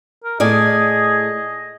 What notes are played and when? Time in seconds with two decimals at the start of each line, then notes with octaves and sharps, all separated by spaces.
0.24 A#4
0.40 A2 G#4 D5 D#5 G#5